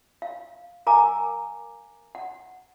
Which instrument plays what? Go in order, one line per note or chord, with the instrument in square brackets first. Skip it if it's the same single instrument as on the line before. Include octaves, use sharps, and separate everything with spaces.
[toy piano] F5
A#4 F5 G#5 A#5 D6
F#5